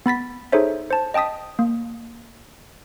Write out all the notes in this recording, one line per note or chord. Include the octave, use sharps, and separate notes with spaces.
B3 B5 A6 B6
D#4 G#4 A4 C5 C#5 E5
C5 A5
D#5 G5 A5 D#6 B6
A#3